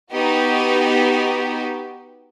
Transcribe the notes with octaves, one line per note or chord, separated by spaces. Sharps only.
B3 D#4 F#4 G4